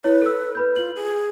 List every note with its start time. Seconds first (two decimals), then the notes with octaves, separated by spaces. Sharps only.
0.04 E4 B4 C#5
0.22 A4 E6
0.55 B4 B5 G6
0.76 F4 F#7
0.96 G#4